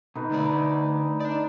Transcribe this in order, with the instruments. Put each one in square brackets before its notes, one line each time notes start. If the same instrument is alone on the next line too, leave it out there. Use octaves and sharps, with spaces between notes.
[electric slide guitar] B2 [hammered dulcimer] D#4 B4
[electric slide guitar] D3 A3 D5
[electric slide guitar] D4 D5 [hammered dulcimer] D#4